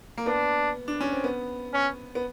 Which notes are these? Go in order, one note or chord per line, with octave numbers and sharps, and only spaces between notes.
A#3
B3 D4
D4
C#4
C4
B3
C#4
B3